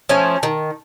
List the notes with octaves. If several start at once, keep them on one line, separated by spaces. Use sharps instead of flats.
F3 A3 C#4
D#3